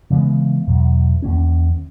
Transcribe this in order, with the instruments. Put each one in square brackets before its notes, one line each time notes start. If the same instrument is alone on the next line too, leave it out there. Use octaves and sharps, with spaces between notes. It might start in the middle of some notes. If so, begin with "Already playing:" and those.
[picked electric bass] C#3 E3 G#3 B3
E2 B2 F#3
E2 D#3 A#3 C#4